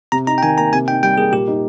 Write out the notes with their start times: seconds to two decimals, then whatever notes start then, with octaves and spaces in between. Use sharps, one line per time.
0.12 C3 A#5
0.27 D#4 A#5
0.38 G5
0.43 D#3 G#5
0.57 A#3 A#5
0.73 C3 G#5
0.88 D#4 G5
1.03 G3 G5
1.18 A#3 G#4
1.33 A#2 G4
1.48 D#4